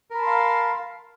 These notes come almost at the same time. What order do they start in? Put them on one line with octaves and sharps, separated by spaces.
A#4 B5 A5 C6 F5